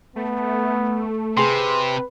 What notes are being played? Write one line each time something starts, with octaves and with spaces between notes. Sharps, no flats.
A3 B3
C3 G#4 B4 C6